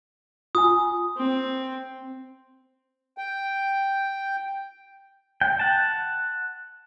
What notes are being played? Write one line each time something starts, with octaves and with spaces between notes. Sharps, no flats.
F4 G#5 D#6
C4
G5
G5
F#5 A5